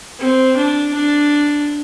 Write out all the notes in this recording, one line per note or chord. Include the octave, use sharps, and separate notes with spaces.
C4
D4
D4